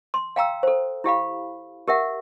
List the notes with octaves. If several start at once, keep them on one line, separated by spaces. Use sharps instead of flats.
C6
F5 G5 A#5 E6
A4 C5
E4 G4 F5 B5
G4 A#4 E5 F#5